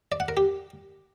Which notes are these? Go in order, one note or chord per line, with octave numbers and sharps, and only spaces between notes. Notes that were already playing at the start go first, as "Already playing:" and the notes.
D5
F#5
A#4
G4